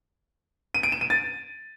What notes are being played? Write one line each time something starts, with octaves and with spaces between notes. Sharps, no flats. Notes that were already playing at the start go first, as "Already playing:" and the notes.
D#7
D7
E7
D#7
A6